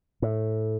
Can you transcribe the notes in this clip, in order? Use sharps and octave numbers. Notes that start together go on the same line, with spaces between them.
A2